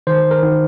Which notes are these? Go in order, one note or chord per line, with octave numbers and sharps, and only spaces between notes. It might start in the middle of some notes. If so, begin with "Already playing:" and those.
D#3 C5
A#4
D#3